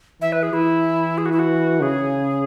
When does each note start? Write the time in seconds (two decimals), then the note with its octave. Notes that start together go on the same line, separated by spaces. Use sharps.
0.21 E3 E5
0.32 B4
0.43 G#4
0.53 E3 E4
1.18 G#4
1.26 F#4
1.32 E4
1.39 F#4
1.82 C#3 G#4